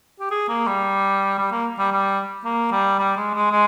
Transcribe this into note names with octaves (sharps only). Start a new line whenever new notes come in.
G4
G#4
A#3
G3
G3
A#3
G3
G3
A#3
G3
G3
G#3
G#3
G#3